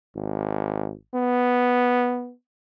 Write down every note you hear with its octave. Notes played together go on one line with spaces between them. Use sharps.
G#1
B3